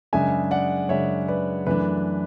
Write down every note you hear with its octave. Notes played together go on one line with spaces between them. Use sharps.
F#2 C#3 G#3 D4 E5 G#5
D5 F#5
F#2 C#3 G#3 D4 C#5 E5
B4 D5
F#2 E3 A3 D4 B4